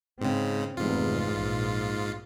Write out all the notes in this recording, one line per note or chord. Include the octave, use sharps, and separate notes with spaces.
G#2 C#3 C4
F1 E2 G#2 F4
A#1